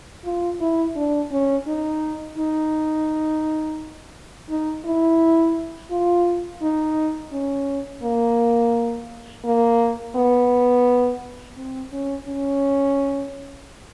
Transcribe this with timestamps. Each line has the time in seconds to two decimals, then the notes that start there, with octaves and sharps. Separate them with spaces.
0.25 F4
0.61 E4
0.96 D4
1.32 C#4
1.67 D#4
2.38 D#4
4.49 D#4
4.85 E4
5.91 F4
6.62 D#4
7.32 C#4
8.03 A#3
9.45 A#3
10.15 B3
11.57 C4
11.92 C#4
12.28 C#4